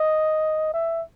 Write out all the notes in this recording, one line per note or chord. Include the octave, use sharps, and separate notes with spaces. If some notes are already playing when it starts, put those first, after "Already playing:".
Already playing: D#5
E5